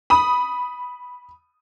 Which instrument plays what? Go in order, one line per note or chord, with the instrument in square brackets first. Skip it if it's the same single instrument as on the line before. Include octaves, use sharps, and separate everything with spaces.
[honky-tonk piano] B5 D#6